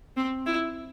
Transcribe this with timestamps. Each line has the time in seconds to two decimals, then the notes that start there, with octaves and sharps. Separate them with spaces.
0.17 C4
0.46 E4